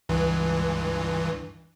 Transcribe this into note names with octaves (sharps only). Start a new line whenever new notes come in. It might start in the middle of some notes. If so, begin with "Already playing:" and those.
C#2 G2 E3